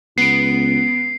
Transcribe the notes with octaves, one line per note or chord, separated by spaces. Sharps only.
C#2 B3 C7 D7